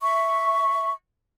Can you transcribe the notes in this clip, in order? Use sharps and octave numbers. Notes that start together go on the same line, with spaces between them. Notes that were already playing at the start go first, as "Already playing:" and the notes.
E5 C#6